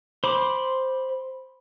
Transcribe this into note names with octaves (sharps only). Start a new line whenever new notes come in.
C5 B5 D6